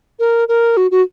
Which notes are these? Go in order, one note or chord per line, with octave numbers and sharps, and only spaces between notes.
A#4
A#4
F#4
F#4